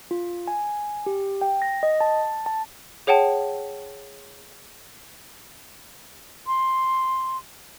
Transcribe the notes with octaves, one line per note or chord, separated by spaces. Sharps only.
F4
G#5
G4
G5
A#6
D#5
A5
A5
G#4 C#5 F#5 G5 A5
C6